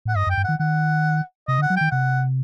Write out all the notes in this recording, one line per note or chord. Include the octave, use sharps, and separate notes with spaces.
A2 F#5
G2 D#5
F#2
G5
G2
D#3 F#5
D#3 F#5
C3 D#5
D3
F#5
F#3
D#3 G5
C3 F#5